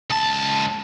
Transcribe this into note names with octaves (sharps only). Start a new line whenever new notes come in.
C#2 A5